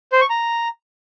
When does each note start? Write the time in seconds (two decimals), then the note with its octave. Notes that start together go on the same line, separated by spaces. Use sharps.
0.12 C5
0.21 C#6
0.30 A#5